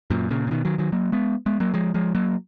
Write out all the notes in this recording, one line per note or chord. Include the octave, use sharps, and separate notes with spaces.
F#2 A#2
A#2 C#3
C#3
B2 D#3
D#3 F#3
D#3 F#3
F#3 A#3
G#3 B3
G#3 B3
F#3 A#3
F3 G#3
F3 G#3
F#3 A#3